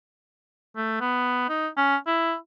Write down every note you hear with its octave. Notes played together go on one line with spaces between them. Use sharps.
A3
B3
D#4
C#4
E4